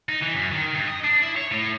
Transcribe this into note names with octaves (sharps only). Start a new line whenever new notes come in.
D#4
E3
F#2
D#3
G2
D#5
D4
E4
C#5
A2